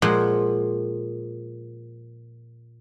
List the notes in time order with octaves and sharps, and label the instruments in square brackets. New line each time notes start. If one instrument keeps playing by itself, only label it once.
[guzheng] A#2 F3 G#3 C5 F#5